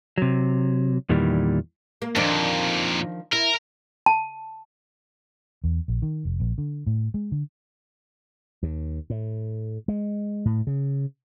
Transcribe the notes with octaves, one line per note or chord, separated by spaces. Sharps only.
C3 F#3
E2 A#2 D#3 E3 G3
A#3
F2 A#2 D#3 F3 D4
E4 A#4
A5
E2
A#1
D#3
F1
A#1
D3
A2
G#3
D3
D#2
A2
G#3
A2
C#3